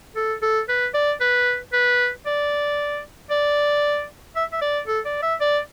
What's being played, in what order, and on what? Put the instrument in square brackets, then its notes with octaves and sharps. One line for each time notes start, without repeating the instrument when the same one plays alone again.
[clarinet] A4
A4
B4
D5
B4
B4
D5
D5
E5
E5
D5
A4
D5
E5
D5